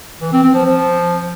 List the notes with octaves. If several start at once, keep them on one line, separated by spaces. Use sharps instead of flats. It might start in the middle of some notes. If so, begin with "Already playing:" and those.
E3
C4
C4
F3
F3